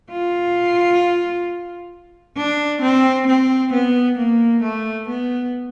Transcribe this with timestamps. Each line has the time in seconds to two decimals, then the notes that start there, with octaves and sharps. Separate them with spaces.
0.11 F4
2.37 D4
2.82 C4
3.27 C4
3.73 B3
4.18 A#3
4.63 A3
5.08 B3